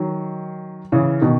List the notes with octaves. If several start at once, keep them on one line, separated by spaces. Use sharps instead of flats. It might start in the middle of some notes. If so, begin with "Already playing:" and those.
Already playing: D#3 F#3
C#3 E3
B2 D#3